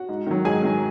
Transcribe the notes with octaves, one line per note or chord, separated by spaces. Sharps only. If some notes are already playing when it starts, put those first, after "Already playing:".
Already playing: F#4 F#5
G#2
D#3 F#3
G#2 G#4 G#5
D#3 F#3